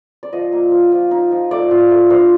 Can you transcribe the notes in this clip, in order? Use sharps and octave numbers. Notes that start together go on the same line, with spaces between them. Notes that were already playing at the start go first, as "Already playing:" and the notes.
D5
F3 D#5
A#3
F3
F3
D#4
F3
A3 D5
F4
A3
D4 C5